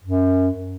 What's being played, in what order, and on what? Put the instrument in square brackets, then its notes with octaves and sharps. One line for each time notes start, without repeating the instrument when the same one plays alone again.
[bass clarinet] F#2